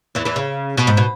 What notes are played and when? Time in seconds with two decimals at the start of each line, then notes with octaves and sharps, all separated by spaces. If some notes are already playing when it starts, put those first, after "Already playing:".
0.15 E2 E3
0.25 E2 E3
0.36 C#3
0.77 B2
0.87 G#2
0.97 B2